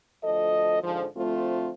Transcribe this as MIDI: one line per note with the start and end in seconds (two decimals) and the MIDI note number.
0.24 0.82 38
0.24 0.82 53
0.24 0.82 69
0.24 0.82 75
0.84 1.06 44
0.84 1.06 50
0.84 1.06 53
1.17 1.72 38
1.17 1.72 53
1.17 1.72 57
1.17 1.72 60
1.17 1.72 65